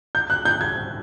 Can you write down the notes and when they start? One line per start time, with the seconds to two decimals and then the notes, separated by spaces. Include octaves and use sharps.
0.15 G6
0.30 F#6
0.45 G6
0.61 G#6